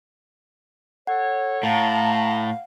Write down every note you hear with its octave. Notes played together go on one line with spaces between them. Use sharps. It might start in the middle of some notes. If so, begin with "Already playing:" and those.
A4 C#5 F#5
A2 F5 A5 A#5